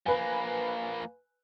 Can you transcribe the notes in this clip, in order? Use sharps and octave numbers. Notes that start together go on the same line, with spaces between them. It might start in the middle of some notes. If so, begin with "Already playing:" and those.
F3 A#3 B4 G#5